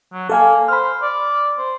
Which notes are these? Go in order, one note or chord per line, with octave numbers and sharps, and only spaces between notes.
F#3
A#3 A4 F5 G#5
C5 B5 F6
D5
C5